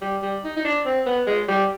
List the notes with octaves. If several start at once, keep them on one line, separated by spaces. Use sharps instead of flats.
G3
G3
D#4
D#4
D4
C4
B3
G#3
G3